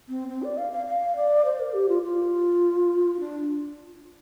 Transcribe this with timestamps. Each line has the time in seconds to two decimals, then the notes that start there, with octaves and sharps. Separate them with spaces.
0.09 C4
0.29 C4
0.43 D5
0.57 F5
0.72 F5
0.86 F5
1.16 D5
1.45 C5
1.60 A#4
1.74 G4
1.89 F4
2.03 F4
3.20 D4